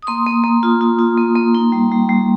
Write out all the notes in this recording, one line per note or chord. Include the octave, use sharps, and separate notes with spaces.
D#6
A#3 C6
A#3
A#3
F4
F4
F4
A#3
A#3
D#4
G3
G3
G3